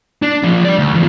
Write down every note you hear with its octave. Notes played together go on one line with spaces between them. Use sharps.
D4
F3 D4
G3 D5
D2
E2 F3